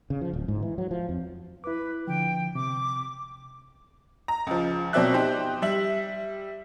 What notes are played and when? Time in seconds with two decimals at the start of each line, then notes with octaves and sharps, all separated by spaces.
0.10 C#3
0.21 F3
0.33 D1
0.48 G#2
0.62 E3
0.78 F#3
0.91 F3
1.09 F2
1.64 E4 B4 D6
2.07 D3 F3 G5
2.55 C3 C4 D6
4.28 A#5
4.47 C#2 F3
4.93 B2 F#3 C4 D5 E5 F#6
5.14 D#4 G4 C5
5.62 G3 E5 F#7